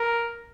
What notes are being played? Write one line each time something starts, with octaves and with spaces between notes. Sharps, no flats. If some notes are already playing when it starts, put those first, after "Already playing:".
Already playing: A#4